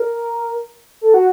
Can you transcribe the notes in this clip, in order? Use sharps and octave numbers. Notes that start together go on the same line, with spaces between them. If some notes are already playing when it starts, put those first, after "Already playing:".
Already playing: A#4
A4
F#4